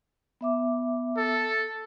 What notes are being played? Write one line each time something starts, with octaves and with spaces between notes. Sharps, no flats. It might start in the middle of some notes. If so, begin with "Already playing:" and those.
B3 E5 D6
A4